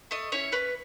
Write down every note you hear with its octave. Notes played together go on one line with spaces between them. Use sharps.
A3 D#5
C#4 E4 C#5
C#4 B4